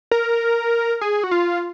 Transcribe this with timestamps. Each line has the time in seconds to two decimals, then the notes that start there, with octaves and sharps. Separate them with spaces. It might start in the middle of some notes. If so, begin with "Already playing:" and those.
0.11 A#4
1.01 G#4
1.24 F#4
1.31 F4